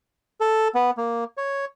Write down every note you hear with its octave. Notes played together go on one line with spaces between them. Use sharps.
A4
B3
A#3
C#5